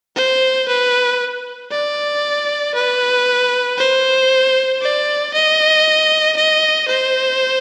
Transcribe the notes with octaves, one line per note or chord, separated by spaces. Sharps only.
C5
B4
D5
B4
C5
D5
D#5
D#5
C5